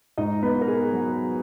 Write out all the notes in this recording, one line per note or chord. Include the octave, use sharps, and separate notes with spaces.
G#2 D#4 D#5
B3 B4
B3
A#4
G#4
F#3